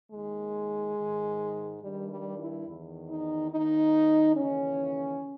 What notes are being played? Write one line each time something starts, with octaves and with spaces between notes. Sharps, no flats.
D#2 D#3 G#3
G#2 D#3
G2 D#3 G3
G3
E4
E2 D#3
D#4
D#2 D#3 D#4
D#2 C#3 E3 C#4